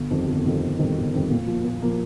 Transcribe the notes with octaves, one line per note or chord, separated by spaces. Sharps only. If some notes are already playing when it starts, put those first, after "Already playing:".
Already playing: G1
F2 D#3 G3 C4
G1
F2 D#3 G3 C4
G1
F2 D#3 G3 C4
G1
F2 D#3 G3 C4
A#2
F3 A#3
A#2
F3 A#3